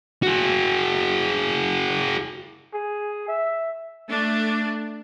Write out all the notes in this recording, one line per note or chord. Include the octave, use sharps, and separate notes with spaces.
F#4 G#4
G#4
E5
A3 D4